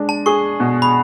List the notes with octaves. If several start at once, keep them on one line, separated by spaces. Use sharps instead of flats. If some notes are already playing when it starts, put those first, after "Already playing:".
Already playing: G#3 D4
A5
G#4 C#6
B2
B5